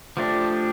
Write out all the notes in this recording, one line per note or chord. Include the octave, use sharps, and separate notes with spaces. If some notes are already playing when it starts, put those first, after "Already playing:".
F3 A3 D4 G4